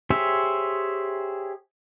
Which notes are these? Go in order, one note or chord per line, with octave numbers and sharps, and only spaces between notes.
G4 G#4 C5 C#5 E5